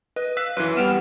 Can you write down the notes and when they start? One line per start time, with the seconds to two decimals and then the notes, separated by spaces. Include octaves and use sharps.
0.16 B4 D#5
0.37 F5 E6 F#6 B6
0.57 F#2 E3 B4
0.77 G3 B3 F6 D7 E7